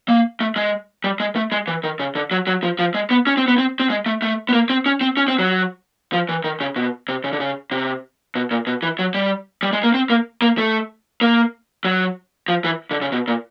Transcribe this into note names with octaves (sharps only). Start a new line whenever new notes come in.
A#3
A3
G#3
G3
G#3
A3
G#3
E3
D#3
C#3
D3
F#3
F#3
F3
F3
G#3
B3
C#4
C4
B3
C4
C4
G#3
A3
A3
B3
A#3
C4
C#4
C4
C#4
C4
F#3
F3
E3
D#3
C#3
B2
C3
C#3
D3
C#3
C3
B2
A#2
B2
E3
F#3
G3
G3
G#3
A#3
C4
A#3
A#3
A3
A#3
F#3
F3
E3
D3
C#3
B2
A#2